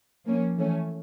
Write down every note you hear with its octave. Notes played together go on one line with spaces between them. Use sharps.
F3 A#3 C#4
E3 A3 C#4